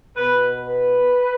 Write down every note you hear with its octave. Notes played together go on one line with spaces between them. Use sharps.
B2 B4
B4